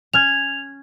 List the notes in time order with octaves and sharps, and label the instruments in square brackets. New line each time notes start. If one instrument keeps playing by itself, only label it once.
[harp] C#4 F6 G#6 [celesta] F7